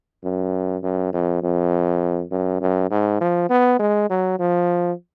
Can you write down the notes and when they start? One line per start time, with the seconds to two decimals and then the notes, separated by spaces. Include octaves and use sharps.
0.24 F#2
0.83 F#2
1.13 F2
1.43 F2
2.31 F#2
2.61 F#2
2.90 G#2
3.21 F3
3.50 B3
3.79 G#3
4.10 F#3
4.39 F3